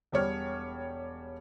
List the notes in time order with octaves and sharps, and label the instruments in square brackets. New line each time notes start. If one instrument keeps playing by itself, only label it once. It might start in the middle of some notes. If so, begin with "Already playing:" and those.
[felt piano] E1 G3 C#5 F6